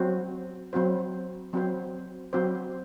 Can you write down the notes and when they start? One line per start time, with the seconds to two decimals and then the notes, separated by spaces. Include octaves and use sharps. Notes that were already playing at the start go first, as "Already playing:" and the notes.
Already playing: F#3 C4 F#4 C5
0.73 F#3 C4 F#4 C5
1.53 F#3 C4 F#4 C5
2.33 F#3 C4 F#4 C5